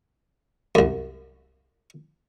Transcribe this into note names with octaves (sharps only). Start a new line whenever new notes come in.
C2 F#2